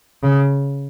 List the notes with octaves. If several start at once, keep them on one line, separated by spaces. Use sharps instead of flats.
C#3